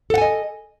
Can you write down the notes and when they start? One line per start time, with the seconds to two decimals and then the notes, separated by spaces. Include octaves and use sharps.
0.10 A4
0.14 F#5
0.18 G#5
0.22 D#5